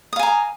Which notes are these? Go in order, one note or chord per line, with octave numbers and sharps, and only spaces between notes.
F5 G#5 A#5 D#6